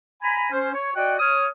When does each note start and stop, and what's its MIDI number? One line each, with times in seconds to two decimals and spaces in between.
0.22 0.50 80
0.22 0.50 82
0.22 0.50 83
0.51 0.71 61
0.51 0.71 72
0.73 0.91 73
0.95 1.17 66
0.95 1.17 74
0.95 1.17 75
0.95 1.17 78
0.95 1.17 79
1.19 1.46 73
1.19 1.46 87
1.19 1.46 89